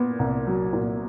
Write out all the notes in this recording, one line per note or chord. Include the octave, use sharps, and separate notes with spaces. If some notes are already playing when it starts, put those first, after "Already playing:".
Already playing: A#2 B3
C2
F#3
A#2